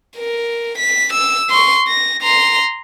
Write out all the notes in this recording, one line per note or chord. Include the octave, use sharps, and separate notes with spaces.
A#4
B6
E6
C6 C#6
A#6
A#5 C6